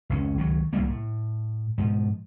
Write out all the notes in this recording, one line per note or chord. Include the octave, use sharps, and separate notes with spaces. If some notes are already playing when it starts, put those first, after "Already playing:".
F1 C#2 C#4
C#2 D#3 F3 F#3
C2 F#2 G3 A#3
A2
G#2 B2 F3